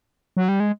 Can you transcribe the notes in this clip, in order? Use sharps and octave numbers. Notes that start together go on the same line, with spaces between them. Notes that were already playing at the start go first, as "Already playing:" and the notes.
F#3
G3
G#3